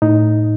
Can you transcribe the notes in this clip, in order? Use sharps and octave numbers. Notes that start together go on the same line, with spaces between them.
A2 D#4